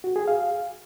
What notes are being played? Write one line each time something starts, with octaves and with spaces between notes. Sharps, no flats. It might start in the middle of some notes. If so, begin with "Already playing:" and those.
F#4
G#4
F5